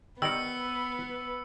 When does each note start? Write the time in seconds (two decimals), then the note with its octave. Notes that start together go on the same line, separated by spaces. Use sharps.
0.22 D#3 G3 B3 A#4 B4 E6 C#7